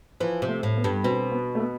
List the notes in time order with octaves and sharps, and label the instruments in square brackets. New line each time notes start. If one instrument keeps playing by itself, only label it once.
[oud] E3 [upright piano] F3
[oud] C3
[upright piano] A3
[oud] A2
[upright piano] B3
[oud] G2
[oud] B2 [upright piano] C4
[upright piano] B3
A3
B3